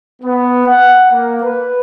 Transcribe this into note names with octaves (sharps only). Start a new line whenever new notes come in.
B3
F#5
A#3
B4